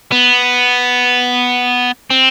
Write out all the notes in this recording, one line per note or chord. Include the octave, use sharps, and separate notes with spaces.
B3
C4